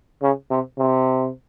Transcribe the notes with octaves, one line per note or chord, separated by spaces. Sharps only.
C#3
C3
C3